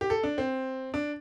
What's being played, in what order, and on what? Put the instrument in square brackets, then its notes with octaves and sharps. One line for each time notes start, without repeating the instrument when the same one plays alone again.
[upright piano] G4
A4
D4
C4
D4